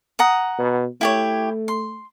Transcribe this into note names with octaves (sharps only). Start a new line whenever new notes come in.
F#5 A#5 D#6
B2
A3 E4 G4 C#5
C6